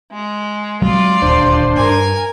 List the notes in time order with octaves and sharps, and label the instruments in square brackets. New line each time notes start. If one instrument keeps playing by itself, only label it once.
[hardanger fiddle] G#3
[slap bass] F#3 G#3 C4 [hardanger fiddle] F4 D5
[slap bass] D#1 D2 [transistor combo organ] D4 C5
[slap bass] G2 [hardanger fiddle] A#4 G#5